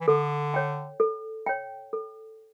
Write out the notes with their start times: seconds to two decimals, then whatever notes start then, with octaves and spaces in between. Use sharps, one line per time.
0.01 E3
0.08 D3 A4
0.54 C#5 G5
1.00 A4
1.46 C#5 G5
1.93 A4